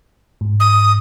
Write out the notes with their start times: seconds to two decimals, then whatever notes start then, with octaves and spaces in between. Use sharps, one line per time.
0.41 G#2
0.60 D#6